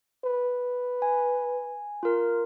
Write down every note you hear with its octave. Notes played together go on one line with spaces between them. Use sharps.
B4
G#5
F4 A#4